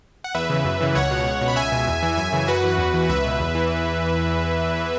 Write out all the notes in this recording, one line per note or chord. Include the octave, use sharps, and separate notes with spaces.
F#5
E2 B4 E5
C#3 E3
F#2
C#3 E3
C#2 C#5 F#5
B2
C#2
B2
B5
C#2 E5 G#5
B2
E2
E3
F#2 E5 G#5
C#3 E3
F#2 F#4 B4
E3
E2
E3
C#2 B4 E5
B2
E2
E3